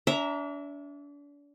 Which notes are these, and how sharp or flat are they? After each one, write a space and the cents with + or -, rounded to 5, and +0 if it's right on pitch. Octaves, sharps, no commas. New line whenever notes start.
D4 -35 E5 +0 A#5 +0